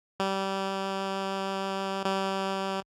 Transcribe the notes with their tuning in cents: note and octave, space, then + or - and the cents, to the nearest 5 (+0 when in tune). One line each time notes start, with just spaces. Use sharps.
G3 -20
G3 -25